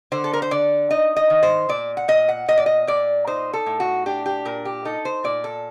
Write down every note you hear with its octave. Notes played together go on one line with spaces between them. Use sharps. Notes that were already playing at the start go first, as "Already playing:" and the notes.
D3 C5
A4
A#4
C5
D3 D5
D#4 D#5
D#5
D#3
C5
A#2 D5
F#5
A#2 D#5
F#5
A#2 D#5
D5
D#5
A#2 D5
D#4 C5
A4
A2
F#4
D4 G4
G4
A#2 A#4
G4
D#4 A4
C5
A#2 D5
A4